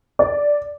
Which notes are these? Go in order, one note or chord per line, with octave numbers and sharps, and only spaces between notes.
D5